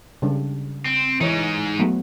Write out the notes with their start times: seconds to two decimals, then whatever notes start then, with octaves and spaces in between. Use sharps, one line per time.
0.22 C#3 G3 D4
0.86 C4
1.21 E3 G#3 D#4 C#5
1.79 F#3 A3 B3